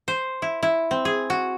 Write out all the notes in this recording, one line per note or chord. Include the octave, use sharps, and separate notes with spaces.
C5
E4
E4
C4
G#4
F#4